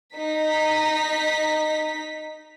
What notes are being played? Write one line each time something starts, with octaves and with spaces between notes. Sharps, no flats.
D#4 B6